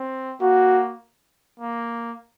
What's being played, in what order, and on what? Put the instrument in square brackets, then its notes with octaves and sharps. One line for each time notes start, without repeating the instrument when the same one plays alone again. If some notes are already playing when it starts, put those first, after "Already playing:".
Already playing: [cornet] C4
[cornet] A#3 [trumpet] F#4
[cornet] A#3